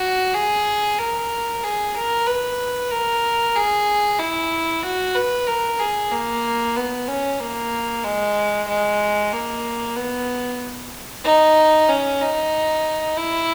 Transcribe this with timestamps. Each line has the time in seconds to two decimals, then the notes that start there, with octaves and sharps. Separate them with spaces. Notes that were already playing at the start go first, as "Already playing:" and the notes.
Already playing: F#4
0.34 G#4
0.99 A#4
1.63 G#4
1.95 A#4
2.26 B4
2.91 A#4
3.55 G#4
4.19 E4
4.83 F#4
5.15 B4
5.47 A#4
5.80 G#4
6.12 A#3
6.76 B3
7.08 C#4
7.40 A#3
8.04 G#3
8.68 G#3
9.32 A#3
9.96 B3
11.24 D#4
11.89 C#4
12.21 D#4
13.17 E4